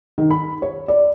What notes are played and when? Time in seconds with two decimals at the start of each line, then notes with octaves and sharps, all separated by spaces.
0.18 D#3
0.30 B5
0.62 C#5
0.88 D5